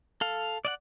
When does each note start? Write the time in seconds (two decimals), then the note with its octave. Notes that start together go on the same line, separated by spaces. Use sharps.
0.21 A4 F5
0.65 D5 D#5 F#5